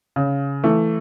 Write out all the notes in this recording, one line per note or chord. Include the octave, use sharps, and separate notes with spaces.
C#3
E3 A3